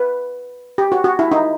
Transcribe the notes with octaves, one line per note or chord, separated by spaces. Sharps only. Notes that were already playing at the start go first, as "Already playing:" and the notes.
Already playing: B4
G4
F#4
F#4
E4
D#4